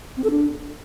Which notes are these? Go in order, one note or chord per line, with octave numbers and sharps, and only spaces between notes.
C4
A4
D4